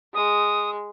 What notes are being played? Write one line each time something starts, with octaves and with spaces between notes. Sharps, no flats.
G#3 D#6